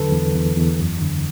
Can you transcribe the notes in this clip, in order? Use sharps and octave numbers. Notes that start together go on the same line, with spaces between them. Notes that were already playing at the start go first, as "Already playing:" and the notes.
Already playing: E2 D3 F#3 A4 B4
E2
E2
E2
F#2
D3